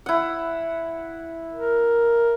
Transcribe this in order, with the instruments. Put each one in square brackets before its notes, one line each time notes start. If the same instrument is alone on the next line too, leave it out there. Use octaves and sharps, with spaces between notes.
[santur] E4 F#5
[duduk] A#4